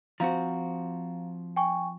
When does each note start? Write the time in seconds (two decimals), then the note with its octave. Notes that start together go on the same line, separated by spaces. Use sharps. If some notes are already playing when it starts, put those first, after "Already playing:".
0.20 F3 C4 F#4 F5 A#5
1.56 G5 G#5 C#6